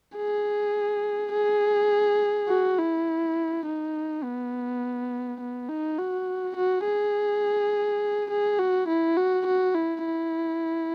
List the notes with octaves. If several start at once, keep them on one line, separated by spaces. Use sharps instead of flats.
G#4
G#4
F#4
E4
D#4
B3
B3
D#4
F#4
F#4
G#4
G#4
F#4
E4
F#4
F#4
E4
E4